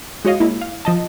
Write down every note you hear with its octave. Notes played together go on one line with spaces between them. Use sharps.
G#3 F#4 C#5 D#5 F5
G#3 A#3 E4
F5
F3 D#5 A5